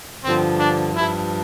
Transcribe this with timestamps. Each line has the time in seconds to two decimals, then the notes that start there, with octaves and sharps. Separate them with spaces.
0.24 G2 D3 F3 C4
0.58 D4
0.93 G2 F3 E4